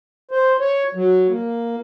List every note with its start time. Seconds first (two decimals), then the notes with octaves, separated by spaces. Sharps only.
0.31 C5
0.60 C#5
0.95 F#3
1.28 A#3